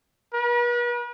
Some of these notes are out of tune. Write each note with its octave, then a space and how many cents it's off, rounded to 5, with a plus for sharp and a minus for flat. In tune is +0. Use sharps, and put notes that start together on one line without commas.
B4 -45